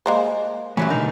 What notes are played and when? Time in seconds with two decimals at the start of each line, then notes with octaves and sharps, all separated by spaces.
0.06 G#3 A#3 C5
0.77 F#2 E3 F#3 G3 A3 C#4
0.90 B2 D3 D#4 A#4